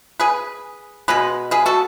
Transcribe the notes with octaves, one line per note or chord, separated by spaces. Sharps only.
G#4 B4
B2 G#3 B3 B4
G#4 B4
F#4 A4